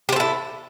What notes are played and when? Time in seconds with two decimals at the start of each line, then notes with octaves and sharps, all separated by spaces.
0.09 G4
0.12 C5
0.16 A4
0.20 E4